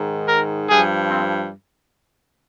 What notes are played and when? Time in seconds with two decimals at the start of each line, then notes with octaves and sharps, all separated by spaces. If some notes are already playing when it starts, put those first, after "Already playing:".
Already playing: G#2 D#3
0.28 A#4
0.69 G2 F3 G#4
1.10 C4